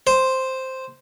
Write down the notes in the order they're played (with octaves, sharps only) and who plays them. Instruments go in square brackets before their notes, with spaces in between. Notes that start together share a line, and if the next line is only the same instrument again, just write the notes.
[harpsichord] C5